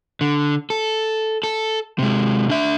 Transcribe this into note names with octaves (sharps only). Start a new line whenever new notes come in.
D3
A4
A4
C3 G#3
D4 E5